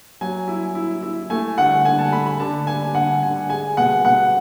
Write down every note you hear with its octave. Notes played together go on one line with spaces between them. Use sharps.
F#3 G#5
E4
E4
E4
A3 G#5
D3 F#5
D3 G#5
A5
A3 B5
B5
D3 A5
D4 G#5
D3 F#5
D3 G#5
G#3 G#5
B2 F#5
B2 F#5